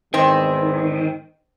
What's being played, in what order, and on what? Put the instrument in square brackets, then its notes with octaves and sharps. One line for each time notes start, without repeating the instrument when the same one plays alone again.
[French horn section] E2 G#2 D#5 [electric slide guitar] D#3 [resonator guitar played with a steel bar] C4